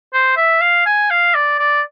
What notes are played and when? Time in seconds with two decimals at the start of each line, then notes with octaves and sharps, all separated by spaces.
0.13 C5
0.36 E5
0.61 F5
0.86 G#5
1.10 F5
1.34 D5
1.59 D5